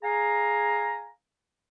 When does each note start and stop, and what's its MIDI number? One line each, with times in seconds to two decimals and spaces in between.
0.03 1.08 68
0.03 1.08 77
0.03 1.08 80
0.03 1.08 82